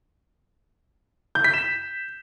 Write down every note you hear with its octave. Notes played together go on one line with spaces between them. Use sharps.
G6
B6
E7